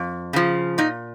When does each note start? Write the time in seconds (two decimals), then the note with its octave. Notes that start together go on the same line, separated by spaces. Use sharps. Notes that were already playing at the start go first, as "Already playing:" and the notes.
Already playing: F2
0.33 C#3 F3
0.78 A#2 D#4